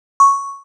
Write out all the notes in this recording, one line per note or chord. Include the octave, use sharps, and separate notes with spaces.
C#6